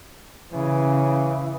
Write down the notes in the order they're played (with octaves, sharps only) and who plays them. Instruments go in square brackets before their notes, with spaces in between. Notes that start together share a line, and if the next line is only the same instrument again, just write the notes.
[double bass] C#3 [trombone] E3